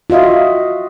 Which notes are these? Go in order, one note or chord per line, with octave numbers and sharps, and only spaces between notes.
F4 F#4 D#5 E5